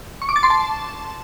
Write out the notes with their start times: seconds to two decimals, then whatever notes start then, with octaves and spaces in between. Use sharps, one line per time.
0.22 C#6
0.29 D6
0.36 A6
0.43 C6
0.50 A5